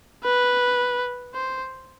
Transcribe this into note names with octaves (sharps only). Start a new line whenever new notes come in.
B4
C5